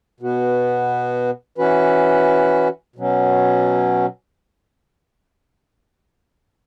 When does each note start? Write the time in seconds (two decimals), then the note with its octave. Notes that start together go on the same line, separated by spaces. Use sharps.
0.20 B2 B3 F#4
1.58 E3 C#4 F#4 B4
2.96 B2 F#3 C#4